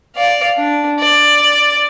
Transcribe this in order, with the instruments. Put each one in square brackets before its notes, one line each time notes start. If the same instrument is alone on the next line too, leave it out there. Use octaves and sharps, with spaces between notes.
[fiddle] D5 F5
D4
D5